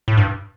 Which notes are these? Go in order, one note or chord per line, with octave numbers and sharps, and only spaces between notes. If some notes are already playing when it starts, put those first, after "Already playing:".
A2
G2